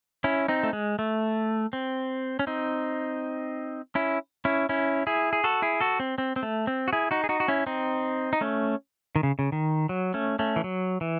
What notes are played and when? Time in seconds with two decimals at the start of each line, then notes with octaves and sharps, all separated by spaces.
0.24 C#4 E4
0.48 C4 D#4
0.63 A3
0.73 G#3
0.99 A3
1.73 C4
2.39 C#4
2.47 C4 D#4
3.95 C#4 E4
4.45 C#4 E4
4.69 C#4 E4
5.07 E4 G#4
5.33 G#4
5.44 F#4 A4
5.62 E4 G#4
5.80 F#4 A4
6.00 C4
6.18 C4
6.36 C4
6.43 A3
6.67 C4
6.88 F#4
6.93 E4 G#4
7.11 D#4 F#4
7.24 G#4
7.29 D#4 F#4
7.40 F#4
7.48 C#4 E4
7.67 C4 D#4
8.33 D#4
8.41 A3 C#4
9.16 D#3
9.23 C#3
9.39 C#3
9.52 D#3
9.89 F#3
10.14 A3 C#4
10.39 A3 C#4
10.56 E3
10.64 F#3
11.01 E3